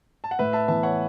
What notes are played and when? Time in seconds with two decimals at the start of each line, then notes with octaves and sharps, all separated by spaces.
0.24 A5
0.31 F#5
0.39 A2 B4 E5
0.53 E5 A5
0.68 E3 B3 E5 A5
0.83 C#5 F#5